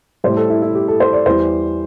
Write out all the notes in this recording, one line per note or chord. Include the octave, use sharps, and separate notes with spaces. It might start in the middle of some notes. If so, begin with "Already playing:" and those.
A2 G3 C5
A4
E4
E4
G4
A4
C5
D5
E2 E3 G3 C5